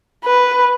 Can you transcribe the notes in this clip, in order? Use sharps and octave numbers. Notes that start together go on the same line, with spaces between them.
B4